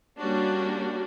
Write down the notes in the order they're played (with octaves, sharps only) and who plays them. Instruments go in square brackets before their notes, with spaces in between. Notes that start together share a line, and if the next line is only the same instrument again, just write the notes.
[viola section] G3 A#3 C#4 D4 F#4